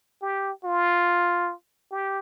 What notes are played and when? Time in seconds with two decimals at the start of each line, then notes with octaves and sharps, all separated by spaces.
0.22 G4
0.64 F4
1.91 G4